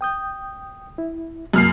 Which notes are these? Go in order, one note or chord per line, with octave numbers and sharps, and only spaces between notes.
G5 D#6 G6
E4
C2 F#2 A#3 F6 C7